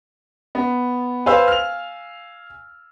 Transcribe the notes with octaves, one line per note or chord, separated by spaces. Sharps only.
B3
B4 C5 F5 G#5 E6
F6 F7